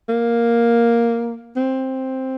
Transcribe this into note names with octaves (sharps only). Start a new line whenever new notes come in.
A#3
C4